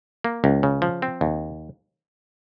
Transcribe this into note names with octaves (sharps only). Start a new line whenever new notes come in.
A#3
C#2
C#3
F3
C4
D#2